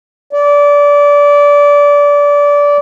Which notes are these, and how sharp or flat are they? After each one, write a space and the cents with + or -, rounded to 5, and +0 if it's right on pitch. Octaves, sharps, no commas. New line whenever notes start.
D5 -25